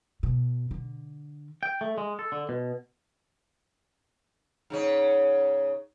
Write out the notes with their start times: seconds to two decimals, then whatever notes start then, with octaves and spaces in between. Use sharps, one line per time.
0.23 B2
0.71 D3
1.63 G5
1.81 A3
1.98 G#3
2.19 A4
2.32 D3
2.49 B2
4.70 G#2 C#3 C#4